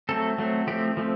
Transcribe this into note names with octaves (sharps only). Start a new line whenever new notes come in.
F#3 A3 C4 A4
F#3 A3 C4
F3 A3 C4 G4
F3 A3 C4